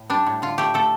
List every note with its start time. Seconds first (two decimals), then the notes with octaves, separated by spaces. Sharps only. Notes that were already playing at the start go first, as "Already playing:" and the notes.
Already playing: A2
0.10 G3 D4
0.26 A2
0.42 D3 F4
0.58 A3 G4
0.74 A3 A4